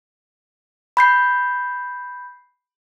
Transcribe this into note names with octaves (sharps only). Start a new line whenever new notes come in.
B5 G6 C7